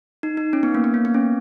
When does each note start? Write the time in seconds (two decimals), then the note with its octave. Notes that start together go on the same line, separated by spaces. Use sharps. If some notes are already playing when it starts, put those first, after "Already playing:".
0.23 D#4
0.37 D#4
0.53 C#4
0.63 B3
0.75 A#3
0.84 B3
0.94 A#3
1.05 B3
1.14 C#4